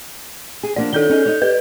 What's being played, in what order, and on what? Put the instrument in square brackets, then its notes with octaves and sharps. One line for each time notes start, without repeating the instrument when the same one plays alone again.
[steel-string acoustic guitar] G#4
[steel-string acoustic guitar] F3 A#3 D4 [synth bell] D5
[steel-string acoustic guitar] D#3 D4 F4 [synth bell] A4 G6 G7
[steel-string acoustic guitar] C#4 D#4 G#4
D#4 C#5
[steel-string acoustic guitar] G4 [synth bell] B4